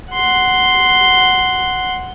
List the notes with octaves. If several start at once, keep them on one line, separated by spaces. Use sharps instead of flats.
F#5 C6